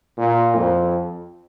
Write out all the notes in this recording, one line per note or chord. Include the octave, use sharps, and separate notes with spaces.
A#2
F2